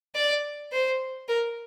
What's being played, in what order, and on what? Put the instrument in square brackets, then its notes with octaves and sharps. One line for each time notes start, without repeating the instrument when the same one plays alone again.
[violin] D5
C5
A#4